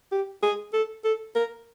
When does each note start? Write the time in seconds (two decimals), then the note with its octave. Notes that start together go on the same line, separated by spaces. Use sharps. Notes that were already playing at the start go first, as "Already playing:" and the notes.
0.12 G4
0.43 G#4
0.73 A4
1.04 A4
1.35 A#4